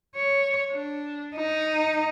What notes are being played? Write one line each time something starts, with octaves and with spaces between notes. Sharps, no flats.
C#5
D4
D#4